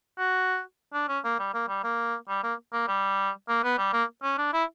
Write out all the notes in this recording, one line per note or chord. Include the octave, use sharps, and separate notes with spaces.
F#4
D4
C#4
A#3
G3
A#3
G3
A#3
G3
A#3
A#3
G3
A#3
B3
G3
A#3
C#4
D4
E4